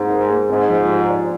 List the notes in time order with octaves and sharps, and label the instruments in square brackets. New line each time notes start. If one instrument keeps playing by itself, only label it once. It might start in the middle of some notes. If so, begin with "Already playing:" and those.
Already playing: [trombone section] G#2 [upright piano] G#3 C4 D#4
[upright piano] A#4
G#3
[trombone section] G#2 [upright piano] C4
[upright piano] F3
G4
D5